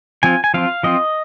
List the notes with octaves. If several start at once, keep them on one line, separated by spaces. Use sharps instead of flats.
F3 C4 F4 G#5
G#5
F3 C4 F4 F5
F3 C4 F4 D#5